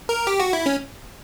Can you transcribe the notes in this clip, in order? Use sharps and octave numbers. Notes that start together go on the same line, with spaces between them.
A#4
G4
F#4
E4
C#4